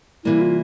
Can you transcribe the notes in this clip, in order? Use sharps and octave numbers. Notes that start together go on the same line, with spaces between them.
C3 E3 G3 A#3 E4
F4